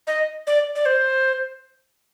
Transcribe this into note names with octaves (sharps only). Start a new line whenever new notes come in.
D#5
D5
D5
C5